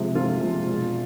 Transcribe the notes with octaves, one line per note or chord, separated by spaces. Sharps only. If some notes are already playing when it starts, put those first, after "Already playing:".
Already playing: C3 F3 G#3
F2 F4
C3 F3 G#3
E1